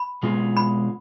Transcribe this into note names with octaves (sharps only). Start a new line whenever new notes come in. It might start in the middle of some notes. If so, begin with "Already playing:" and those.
Already playing: B5
B2 G#3 B3 F4 G#4
B5